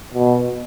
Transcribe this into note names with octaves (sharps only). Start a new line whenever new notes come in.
B2